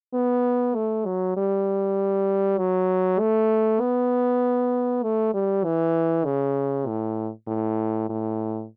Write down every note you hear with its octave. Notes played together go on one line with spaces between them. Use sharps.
B3
A3
F#3
G3
F#3
A3
B3
A3
G3
E3
C#3
A2
A2
A2